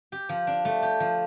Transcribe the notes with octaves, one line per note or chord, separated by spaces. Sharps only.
G4
F3
D4
A3
G4
F3